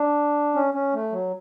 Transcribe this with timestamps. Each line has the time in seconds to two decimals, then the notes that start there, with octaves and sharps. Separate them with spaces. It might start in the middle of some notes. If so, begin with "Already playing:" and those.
Already playing: D4
0.55 C#4
0.74 C#4
0.94 A3
1.12 F#3